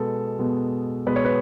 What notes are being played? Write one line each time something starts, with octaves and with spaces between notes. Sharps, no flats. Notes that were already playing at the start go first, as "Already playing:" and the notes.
Already playing: B2 G#3 B3 A4
B2 G#3 B3
B2 G#3 B3 B4
C#5
B4